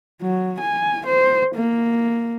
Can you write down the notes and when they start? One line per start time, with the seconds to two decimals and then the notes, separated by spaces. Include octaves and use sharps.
0.22 F#3
0.60 G#5
1.06 C5
1.55 A#3